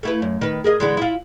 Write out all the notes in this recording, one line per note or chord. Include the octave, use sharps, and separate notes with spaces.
A3 E4 B4
F#2
D#3 B4
G#4 A#4 D#5
D3 E3 G#3
E4 F4